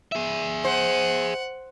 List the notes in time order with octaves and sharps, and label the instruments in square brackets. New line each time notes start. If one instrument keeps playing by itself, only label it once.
[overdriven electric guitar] G#4 E5
[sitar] C5 [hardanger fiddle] F#5